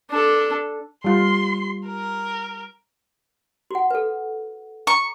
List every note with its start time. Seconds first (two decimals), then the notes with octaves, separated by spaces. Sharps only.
0.10 D4 A4
1.04 G3 F4 C6
1.87 A#4
3.71 F#4 F#5
3.91 A4 B4
4.87 A#5 C#6